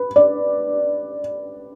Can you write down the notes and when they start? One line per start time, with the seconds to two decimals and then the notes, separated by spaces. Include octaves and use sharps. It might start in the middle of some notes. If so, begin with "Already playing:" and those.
Already playing: B4
0.16 D5